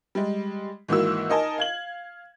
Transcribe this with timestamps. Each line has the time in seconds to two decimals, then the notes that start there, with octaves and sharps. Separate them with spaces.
0.15 G3 G#3
0.88 G#2 D#3 E3 A#3 F#4 E6
1.30 D#4 A#4 D#5 G#5 A5
1.58 F5 G#6 F#7